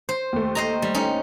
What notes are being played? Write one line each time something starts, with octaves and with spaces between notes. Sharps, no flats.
C5
D#2 A3
C5 D#5 A#5
G3
C#4 D#4